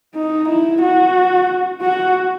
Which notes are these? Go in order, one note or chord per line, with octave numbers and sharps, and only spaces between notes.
D#4
E4
F#4
F#4